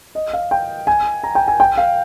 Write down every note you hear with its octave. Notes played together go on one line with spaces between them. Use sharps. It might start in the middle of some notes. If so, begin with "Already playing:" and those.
D#5
F5
G5
G#5
A#5
G5
G#5
G5
F5